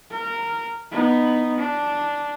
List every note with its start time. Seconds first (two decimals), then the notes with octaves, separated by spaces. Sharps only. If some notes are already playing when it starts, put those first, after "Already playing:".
0.11 A#4
0.91 B3 D#4
1.58 D4